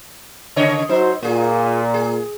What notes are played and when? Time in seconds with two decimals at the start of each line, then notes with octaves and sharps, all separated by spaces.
0.56 C#3 C#5 D#5
0.89 F#3 D#4 C5
1.23 A#2 F4 G#4
1.94 G#4